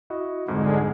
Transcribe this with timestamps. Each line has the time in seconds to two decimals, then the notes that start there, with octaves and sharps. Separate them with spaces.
0.10 E4 F#4 D#5
0.48 C2 F2 G#2 D3 G#3